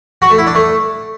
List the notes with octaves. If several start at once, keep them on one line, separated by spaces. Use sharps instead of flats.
F#4
A3
E4
D4
A3